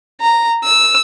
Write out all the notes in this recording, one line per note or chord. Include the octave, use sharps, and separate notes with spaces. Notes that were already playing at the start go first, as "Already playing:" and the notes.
A#5
E6